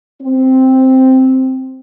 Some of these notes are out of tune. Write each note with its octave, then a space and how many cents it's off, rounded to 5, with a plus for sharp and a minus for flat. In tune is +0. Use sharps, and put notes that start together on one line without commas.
C4 +0